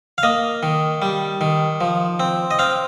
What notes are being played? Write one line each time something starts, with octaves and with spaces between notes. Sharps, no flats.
F5
A#3 D#5
D#3
G3
D#3
F3
C4
D#5
C4 F5